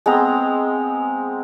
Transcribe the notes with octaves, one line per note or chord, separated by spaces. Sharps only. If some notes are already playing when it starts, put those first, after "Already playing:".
G#3 B3 C4 A#5